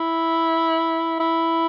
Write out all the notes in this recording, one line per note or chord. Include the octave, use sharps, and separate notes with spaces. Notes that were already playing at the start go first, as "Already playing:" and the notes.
Already playing: E4
E4